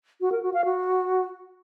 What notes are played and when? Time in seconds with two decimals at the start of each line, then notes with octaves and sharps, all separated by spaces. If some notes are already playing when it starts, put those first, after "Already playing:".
0.21 F#4
0.32 A#4
0.43 F#4
0.54 F5
0.65 F#4